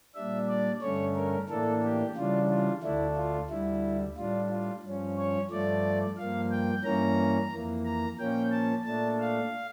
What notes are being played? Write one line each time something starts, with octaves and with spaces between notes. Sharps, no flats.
A#2 G3 D4 E5
D5
G2 D3 A3 C#4 C#5
A#4
A2 E3 A#3 D4 A4
G4
C#3 E3 G3 D4 F4
F4
D2 D3 A3 D4 E4
F4
D2 D3 G3 E4
A2 G3 D4 F4
F4
G2 F3 C#4
C#5
G2 F3 A3 D5
G2 F3 A#3 F5
G5
G2 E3 A#3 C#4 A#5
F2 E3 A#3
A#5
A#2 F3 A#3 C#4 G5
A5
A#2 A3 D4 A5
F5